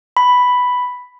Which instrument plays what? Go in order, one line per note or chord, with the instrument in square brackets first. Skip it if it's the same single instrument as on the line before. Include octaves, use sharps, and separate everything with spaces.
[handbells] B5